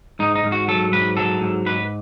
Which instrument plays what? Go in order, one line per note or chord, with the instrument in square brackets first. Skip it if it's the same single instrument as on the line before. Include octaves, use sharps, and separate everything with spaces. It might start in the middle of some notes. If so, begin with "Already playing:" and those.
[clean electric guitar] G#2 D#4
D#4
G#2
F#4
F#3 A4
G#2 B4
F#3 A4
G#2
G#2 B4